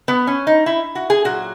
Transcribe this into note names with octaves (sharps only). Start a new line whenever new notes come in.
B3
C#4
D#4
E4
F#4
G#4
A#2 F#3 F#4